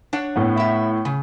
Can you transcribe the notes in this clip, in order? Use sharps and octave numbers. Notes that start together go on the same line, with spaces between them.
D4 C#5 F#5
A2 B3
E4 E5
C#3